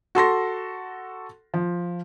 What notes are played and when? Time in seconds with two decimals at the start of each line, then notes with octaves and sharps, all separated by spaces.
0.15 F#4 A4 C6 A#6
1.54 F3